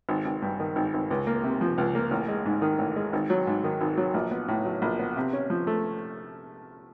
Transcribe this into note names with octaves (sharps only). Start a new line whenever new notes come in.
G#1
G#1
G2
D#3
G#1
G#1
C#2
A#3
C3
F3
C#2
A#3
A1
G#3
G#2
D#3
A1
G#3
G#1
F#3
G#2
D#3
G#1
F#3
A#1
B3
A2
F#3
A#1
B3
C3
C#4
F3
A3